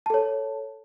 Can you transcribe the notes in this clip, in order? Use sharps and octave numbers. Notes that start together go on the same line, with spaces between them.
A4 C#5 A5